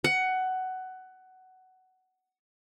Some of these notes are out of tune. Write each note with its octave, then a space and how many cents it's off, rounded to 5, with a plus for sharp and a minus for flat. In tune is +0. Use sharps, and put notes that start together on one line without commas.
F#5 +15